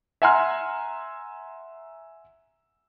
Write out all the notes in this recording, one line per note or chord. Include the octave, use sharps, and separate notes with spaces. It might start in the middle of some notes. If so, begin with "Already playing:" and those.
E5 F#5 G#5 A#5 C6 F6